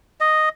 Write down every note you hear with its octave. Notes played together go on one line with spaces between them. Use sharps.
D#5